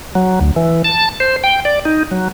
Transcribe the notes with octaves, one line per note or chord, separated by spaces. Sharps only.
F#3
D2
E3
A5
C5
G5
D5
D#4
F#3